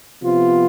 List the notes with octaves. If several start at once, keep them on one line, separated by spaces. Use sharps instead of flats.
C3 F3 B3 F4